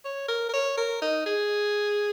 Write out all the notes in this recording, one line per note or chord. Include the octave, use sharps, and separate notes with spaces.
C#5
A#4
A#4
C#5
A#4
D#4
G#4